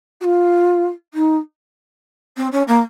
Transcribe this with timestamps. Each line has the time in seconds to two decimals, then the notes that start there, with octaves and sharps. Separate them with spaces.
0.21 F#4
0.24 F4
1.14 D#4
2.37 C4
2.52 C#4
2.67 A#3